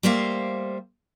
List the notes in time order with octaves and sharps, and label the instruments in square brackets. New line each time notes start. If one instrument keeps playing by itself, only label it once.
[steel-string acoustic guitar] G3 A3 A#3 C5 E5 F5